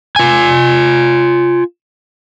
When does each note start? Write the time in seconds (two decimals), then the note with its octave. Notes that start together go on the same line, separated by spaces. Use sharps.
0.16 F4 G#5